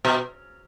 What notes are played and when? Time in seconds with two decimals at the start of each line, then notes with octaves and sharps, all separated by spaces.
0.05 B2